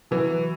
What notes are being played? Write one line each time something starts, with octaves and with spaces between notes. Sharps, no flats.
E3 F#3